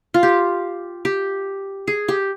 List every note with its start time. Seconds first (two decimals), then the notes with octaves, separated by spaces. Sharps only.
0.14 F4
0.23 G4
1.05 G4
1.88 G#4
2.08 G4